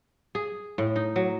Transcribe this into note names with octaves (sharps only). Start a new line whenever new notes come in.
G#4
A2
D#4
F#3